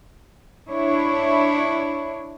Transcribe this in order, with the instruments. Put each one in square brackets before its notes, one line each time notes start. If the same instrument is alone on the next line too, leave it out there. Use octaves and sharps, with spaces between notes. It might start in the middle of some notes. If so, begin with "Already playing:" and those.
[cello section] D4 E4 C#5